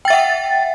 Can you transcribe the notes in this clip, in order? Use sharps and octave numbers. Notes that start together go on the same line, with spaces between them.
E5 F#5 G5 A6